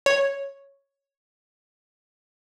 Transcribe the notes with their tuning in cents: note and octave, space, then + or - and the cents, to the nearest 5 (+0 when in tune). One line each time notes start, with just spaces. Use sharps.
C#5 +0